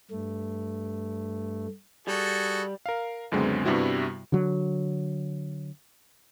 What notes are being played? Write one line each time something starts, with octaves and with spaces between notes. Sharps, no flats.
G2 A3
G3 F#4 G#4 A4
A#4 F5
C#2 F#2 D3 G#3 B3 C4
G2 C3 G3 B3 E4 F#4
D3 F#3